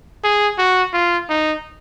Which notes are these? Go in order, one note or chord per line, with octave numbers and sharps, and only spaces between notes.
G#4
F#4
F4
D#4